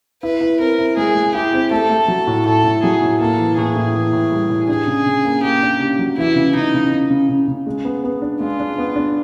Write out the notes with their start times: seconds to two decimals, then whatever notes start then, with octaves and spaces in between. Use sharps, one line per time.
0.23 E4 B4
0.41 E4
0.60 C4 A#4
0.79 E4
0.97 G#3 G#4
1.15 G#3
1.34 E4 G4
1.53 C4
1.71 A3 A4
1.89 A3
2.08 F#3
2.27 A2
2.45 A2 A4
2.64 A2
2.83 F#3 G#4
3.02 A2
3.20 A#3 A4
3.39 E3
3.57 A2 G#4
3.76 A2
3.95 E3
4.13 A2
4.32 G3
4.50 A2
4.69 D4 G#4
4.87 C#3
5.06 C#3
5.25 A#3
5.43 A#3 G4
5.62 D4
5.80 C#3
5.99 F#3
6.17 E3 E4
6.36 C#3
6.55 C#3 D#4
6.74 C#3
6.91 C#3
7.10 C#3
7.29 C#3
7.48 C#3
7.67 G#3
7.85 B3
8.04 B3
8.22 D4
8.41 G#3 F4
8.60 D4
8.78 B3
8.96 D4